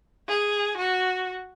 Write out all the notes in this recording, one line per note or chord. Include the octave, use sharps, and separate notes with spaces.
G#4
F#4